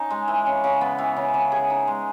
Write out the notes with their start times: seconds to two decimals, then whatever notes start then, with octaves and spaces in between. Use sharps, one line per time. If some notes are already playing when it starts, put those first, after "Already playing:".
Already playing: C#4 D#4
0.10 G#3
0.28 E3
0.46 C#3
0.64 C#3
0.81 B3
0.99 E3
1.16 C#3
1.34 C#3
1.52 G#4
1.70 D#4
1.87 G#3